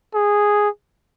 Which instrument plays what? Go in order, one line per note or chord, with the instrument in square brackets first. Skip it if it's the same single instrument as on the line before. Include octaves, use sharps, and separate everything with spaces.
[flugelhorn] G#4